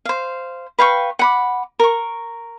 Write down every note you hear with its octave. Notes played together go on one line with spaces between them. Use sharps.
C5 F5
B4 F5 G5 C#6
F#5 B5 D6
A#4 C#6